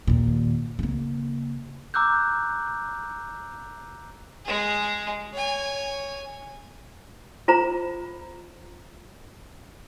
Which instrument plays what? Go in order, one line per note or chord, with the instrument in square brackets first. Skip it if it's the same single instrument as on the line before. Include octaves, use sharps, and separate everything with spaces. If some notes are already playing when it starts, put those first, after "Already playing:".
[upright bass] D#2 A#2
C#3 A#3
[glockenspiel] A#5 D6 E6 F#6 G6
[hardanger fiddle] G#3 G#4
C#5 G#5
[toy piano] F4 C5 A#5